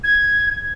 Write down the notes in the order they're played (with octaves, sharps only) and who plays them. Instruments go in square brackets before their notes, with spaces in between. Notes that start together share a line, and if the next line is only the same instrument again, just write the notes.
[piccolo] G#6